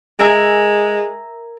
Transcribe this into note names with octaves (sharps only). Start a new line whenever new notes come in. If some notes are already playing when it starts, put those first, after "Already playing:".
G#3 A#4 E5 G#5